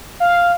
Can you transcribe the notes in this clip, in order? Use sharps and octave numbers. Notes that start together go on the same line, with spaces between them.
F5